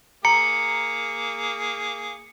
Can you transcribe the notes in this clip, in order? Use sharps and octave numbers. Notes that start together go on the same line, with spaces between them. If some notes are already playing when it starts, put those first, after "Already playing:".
A#3 G#4 A#5 C#7